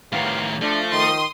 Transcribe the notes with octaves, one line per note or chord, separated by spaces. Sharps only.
A2 C3 D#3 B3 F5
F3 A3 D4
D#3 C6 D#6